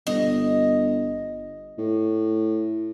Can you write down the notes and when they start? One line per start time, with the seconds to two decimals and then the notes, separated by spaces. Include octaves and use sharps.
0.07 G1 D#5
1.78 A2